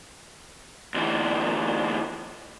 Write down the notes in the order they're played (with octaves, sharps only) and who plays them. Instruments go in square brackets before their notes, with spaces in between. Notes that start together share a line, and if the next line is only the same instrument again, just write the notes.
[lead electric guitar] D2 E3